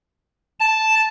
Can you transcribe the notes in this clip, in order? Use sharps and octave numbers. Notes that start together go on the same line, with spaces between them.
A5